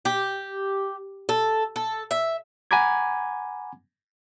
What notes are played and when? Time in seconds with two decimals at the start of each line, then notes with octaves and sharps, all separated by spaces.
0.05 G4
1.29 A4
1.76 A4
2.11 E5
2.71 F#5 G#5 A#5 B5 D6 G#6